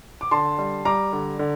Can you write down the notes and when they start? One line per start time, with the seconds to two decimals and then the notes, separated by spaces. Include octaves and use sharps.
0.21 D6
0.31 D3 A5 C6
0.58 G3
0.85 G3 A#5 D6
1.13 D3
1.39 D3